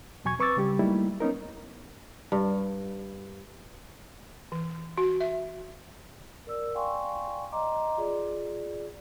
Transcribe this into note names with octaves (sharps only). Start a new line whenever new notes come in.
E2 B2 F#3 G#5 C#6 G#6
C4 B4 C#6 D6 E6 A6
C#3 G3 G4
F#3 G3 A3 A#3 D#4 E4
B3 C#4 D#4 A#4
G2
E3
F#4
E5
A#4 D5 E6
D5 F5 G5 G#5 C6 C#6
D#5 A#5 C6 D6
F4 G#4 D5